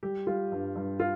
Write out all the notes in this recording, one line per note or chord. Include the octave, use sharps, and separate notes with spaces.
G3 G4
G3 F4
G2
G2
F4